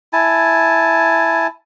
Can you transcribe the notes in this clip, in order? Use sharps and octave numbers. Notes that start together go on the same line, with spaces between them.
E4 G#5 A5